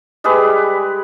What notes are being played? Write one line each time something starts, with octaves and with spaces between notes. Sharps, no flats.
G3 G#3 G#4 B4